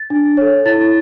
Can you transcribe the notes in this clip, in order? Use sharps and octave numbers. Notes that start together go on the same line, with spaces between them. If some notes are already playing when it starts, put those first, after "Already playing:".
Already playing: A6
D4
A4 C#5
E4 A6